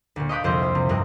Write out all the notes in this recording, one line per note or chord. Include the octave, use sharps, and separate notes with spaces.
D2 A#2
D#5 F5 B5 D6 F#6 G6
C2 F2 C5 D#5 E5 G6
C5
C3
G2 C3 C4 A#4 D#5 F#6